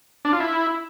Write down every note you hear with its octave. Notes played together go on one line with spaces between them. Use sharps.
D4
F4
E4